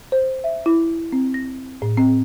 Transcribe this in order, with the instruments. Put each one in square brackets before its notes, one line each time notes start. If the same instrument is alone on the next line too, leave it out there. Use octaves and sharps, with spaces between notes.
[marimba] C5
E5
E4
C4
A#6
A2
C4